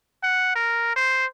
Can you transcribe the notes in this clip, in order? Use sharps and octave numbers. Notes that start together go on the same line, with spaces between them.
F#5
A#4
C5